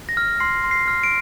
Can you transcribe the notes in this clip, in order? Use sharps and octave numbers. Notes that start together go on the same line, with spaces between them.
A#6
F6
C6 C7
C6
C7
F6
D7